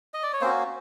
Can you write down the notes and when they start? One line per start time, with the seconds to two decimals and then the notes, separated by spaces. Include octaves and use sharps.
0.14 D#5
0.23 D5
0.33 C#5
0.41 A#3 C4 C#4 F#4 C5